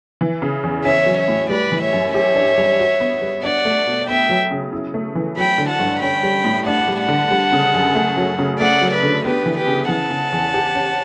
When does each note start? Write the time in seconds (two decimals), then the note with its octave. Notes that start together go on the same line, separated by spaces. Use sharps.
0.21 E3
0.42 C#3
0.63 E2
0.84 C#4 C#5 E5
1.06 F#3
1.18 C#5 E5
1.28 A2
1.49 G3 B4 D5
1.72 E3
1.82 C#5 E5
1.93 F#2
2.14 G4 C#5 E5
2.35 D4
2.58 G3
2.79 F#4
3.00 B3
3.22 G3
3.43 D4 D5 F#5
3.65 A3
3.86 B2
4.07 B3 E5 G5
4.29 F#3
4.51 C#3
4.72 E4
4.94 A3
5.15 E3
5.37 F#3 G5 B5
5.58 D3
5.69 F#5 A5
5.80 G2
6.01 C#4 G5 B5
6.23 G3
6.44 A2
6.66 D4 F#5 A5
6.88 G3
6.98 F#5 A5
7.09 D3
7.31 G3
7.52 C#3
7.74 F#2
7.95 A3
8.17 F#3
8.39 C#3
8.60 A3 D5 F#5
8.81 F#3
8.91 B4 D5
9.03 D3
9.24 B3 G4 B4
9.46 E3
9.56 G4 B4
9.67 C#3
9.89 E3 F#5 A5
10.10 C#3
10.32 E2
10.54 G4
10.75 C#4